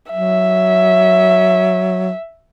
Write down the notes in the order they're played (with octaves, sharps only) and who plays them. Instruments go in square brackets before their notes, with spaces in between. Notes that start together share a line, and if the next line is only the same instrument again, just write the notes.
[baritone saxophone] F#3 [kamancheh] E5